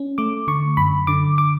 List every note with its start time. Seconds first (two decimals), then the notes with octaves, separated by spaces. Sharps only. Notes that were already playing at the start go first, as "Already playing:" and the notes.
Already playing: C#4
0.18 A3 D6
0.48 D3 C#6
0.77 F#2 B5
1.07 D3 D6
1.38 D6